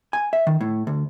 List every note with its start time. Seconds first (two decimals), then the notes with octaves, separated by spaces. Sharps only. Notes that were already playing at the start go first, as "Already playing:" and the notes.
0.13 G#5
0.33 E5
0.47 D#3
0.61 A2
0.87 D2